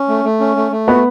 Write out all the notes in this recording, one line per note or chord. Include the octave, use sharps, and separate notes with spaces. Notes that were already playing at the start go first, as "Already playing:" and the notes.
Already playing: C#4
A3
A3
C#4
A3
A3
B3 F#4